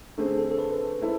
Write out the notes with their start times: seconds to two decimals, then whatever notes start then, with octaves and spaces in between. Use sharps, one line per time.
0.18 D3 A3 C4 G#4
0.38 A4
0.51 A4
0.58 B4
1.01 G#3 C4 E4 A4